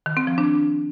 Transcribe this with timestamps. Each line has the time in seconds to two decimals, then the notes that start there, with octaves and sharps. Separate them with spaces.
0.06 D#3
0.17 C4
0.27 F3
0.38 D4